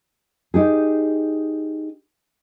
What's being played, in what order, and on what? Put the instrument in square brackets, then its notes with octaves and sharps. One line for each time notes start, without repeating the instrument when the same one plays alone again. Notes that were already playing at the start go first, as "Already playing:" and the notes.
[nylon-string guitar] D#4 G4 G#4